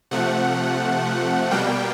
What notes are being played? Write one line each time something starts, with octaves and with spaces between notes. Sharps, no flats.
C3 F3 A3 F#5
B2 G3 A#3 G5